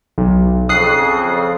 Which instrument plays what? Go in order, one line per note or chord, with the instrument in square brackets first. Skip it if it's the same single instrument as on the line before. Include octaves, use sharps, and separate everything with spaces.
[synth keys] B1
[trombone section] F2 C#3 [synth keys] D#6 F#6 C7